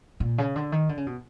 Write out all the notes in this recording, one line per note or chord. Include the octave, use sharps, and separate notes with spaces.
A#2
C#3
D3
D#3
D3
C#3
B2